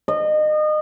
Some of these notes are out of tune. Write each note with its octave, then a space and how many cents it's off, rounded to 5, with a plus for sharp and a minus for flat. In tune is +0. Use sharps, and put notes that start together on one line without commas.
D#5 -30